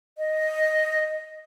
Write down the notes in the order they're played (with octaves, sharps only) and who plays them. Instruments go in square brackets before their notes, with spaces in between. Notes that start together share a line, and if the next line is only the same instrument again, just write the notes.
[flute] D#5